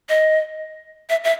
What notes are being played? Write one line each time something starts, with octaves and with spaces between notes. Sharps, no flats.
D#5
E5
E5